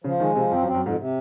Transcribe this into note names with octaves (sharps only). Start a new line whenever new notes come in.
C#3 F3
D#3 G#3
C3 F3
F2 C4
F#2
C4
F#2
F2 G#2
C3